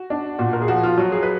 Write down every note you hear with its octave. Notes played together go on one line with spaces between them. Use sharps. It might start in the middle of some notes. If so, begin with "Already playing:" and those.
Already playing: F#4
D4
A#2 F#4
A#4
G#4
F3 F#4
F4
F#3 F#4
G#4
B4